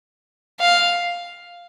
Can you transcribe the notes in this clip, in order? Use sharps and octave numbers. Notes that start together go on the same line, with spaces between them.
F5